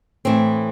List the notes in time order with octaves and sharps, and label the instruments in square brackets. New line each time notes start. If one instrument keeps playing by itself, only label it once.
[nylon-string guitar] A2 E3 C4